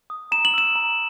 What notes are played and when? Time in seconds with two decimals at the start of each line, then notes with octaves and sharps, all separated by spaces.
0.10 D#6
0.32 A#5 E7
0.45 F#7
0.54 E6 E7
0.75 A#5